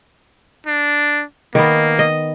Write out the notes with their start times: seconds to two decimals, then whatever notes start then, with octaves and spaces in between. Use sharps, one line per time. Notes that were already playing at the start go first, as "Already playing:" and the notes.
0.67 D4
1.55 D#3 A#3 B3
1.99 D#5